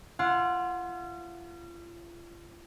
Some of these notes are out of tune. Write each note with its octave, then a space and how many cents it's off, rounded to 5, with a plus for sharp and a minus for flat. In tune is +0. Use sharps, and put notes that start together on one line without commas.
F4 -35 F#5 -30 C6 +0